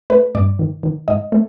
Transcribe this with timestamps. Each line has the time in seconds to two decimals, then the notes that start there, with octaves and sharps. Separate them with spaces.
0.10 A3 B4
0.35 G2 D5
0.59 D#3
0.83 D#3
1.08 G#2 D#5
1.32 A3